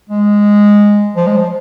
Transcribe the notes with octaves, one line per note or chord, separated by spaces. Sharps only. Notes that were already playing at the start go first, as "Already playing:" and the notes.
G#3
F3
G#3
F3